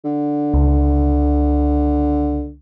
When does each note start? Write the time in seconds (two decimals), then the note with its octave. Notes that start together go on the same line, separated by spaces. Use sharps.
0.05 D3
0.54 C#2